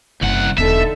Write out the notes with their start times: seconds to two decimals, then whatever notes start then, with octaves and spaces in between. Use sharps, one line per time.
0.22 F#1 C2 F#5
0.58 E1 D3 D4 D#4 A4 E5